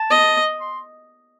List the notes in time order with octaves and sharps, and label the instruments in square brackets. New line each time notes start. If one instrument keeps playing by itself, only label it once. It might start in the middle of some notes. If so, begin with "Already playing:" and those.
Already playing: [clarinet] A5
[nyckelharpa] D#5
[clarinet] C6